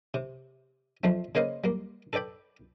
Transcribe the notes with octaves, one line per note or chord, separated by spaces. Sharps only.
C3
F2 F3 A3 C4
C#3 A#3 B4 C5 D#5 F5
G3 A#3
A4 B4 D5 G5 B5